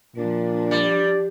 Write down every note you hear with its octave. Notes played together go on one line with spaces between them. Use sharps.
A#2 F3 D4
G3 D5